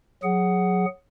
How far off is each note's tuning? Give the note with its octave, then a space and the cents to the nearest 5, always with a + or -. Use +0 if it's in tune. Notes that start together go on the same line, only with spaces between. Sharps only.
F#3 -15 G#4 +0 F#5 +10